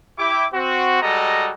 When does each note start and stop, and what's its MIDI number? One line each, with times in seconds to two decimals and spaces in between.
0.18 0.45 64
0.18 0.45 67
0.18 0.45 86
0.53 1.00 60
0.53 1.00 66
1.02 1.51 55
1.02 1.51 56
1.02 1.51 66
1.02 1.51 69
1.02 1.51 75
1.02 1.51 82